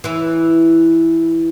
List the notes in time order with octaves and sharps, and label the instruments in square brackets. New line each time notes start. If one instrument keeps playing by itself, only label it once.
[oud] E3 E4